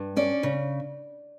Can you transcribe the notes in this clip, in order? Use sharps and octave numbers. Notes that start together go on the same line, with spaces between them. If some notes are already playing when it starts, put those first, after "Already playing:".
Already playing: G2
C#4 D5
C#3